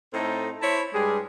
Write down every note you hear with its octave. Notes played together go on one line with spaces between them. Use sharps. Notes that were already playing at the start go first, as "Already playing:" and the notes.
A2 A3 C4 D#4 A4
E4 C5 C#5 A5 B5
G2 G3 G#3 G#4